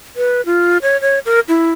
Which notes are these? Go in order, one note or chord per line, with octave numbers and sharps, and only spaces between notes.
B4
F4
C#5
C#5
A#4
E4